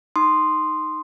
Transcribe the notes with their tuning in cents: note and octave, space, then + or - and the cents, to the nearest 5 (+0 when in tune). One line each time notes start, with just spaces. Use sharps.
D#4 +0 C6 +0 D#6 -15